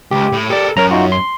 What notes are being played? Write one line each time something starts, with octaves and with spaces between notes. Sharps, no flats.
C#2 G4
A2
G4 A4 A#4 D5
F#2 A#4 C#5 A#5
D#4 F4 F#4
C6